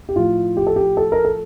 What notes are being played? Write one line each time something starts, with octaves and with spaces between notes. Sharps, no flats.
G4
A2 F3 F4
G4
A4
G4
A4
A#4
A4